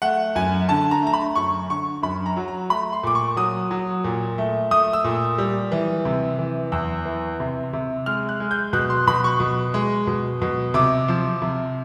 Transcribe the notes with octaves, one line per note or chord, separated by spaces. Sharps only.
A3 F#5
F#2 G#5
D3 A5
A#5
A3 A#5
B5
F#2 C#6
D3 C#6
F#2 B5
A#5
F#3
A#5
A3 B5
C6
A#2 D6
C#6
F#3 D#6
F#3
A#2
A3
A3 D#6
E6
A#2
G3
E3
C3
E3
E2 E6
E3
C3
C3
G#3 F6
F#6
G#3
G6
B2 F#6
C6
B2 B5
C#6
B2
G#3
B2
B2
C3 D6
F3
C3